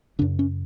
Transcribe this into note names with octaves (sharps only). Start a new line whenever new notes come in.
F#2 C#3 D4
C#4